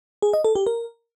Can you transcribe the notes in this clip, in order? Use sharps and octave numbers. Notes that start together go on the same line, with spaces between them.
G#4
D#5
A4
G4
A#4